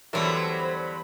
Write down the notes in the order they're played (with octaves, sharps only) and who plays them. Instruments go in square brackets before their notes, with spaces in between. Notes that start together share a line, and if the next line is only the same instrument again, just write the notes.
[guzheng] E2 G3 A#4 [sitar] D3 F#3 A3 [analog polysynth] C5 B5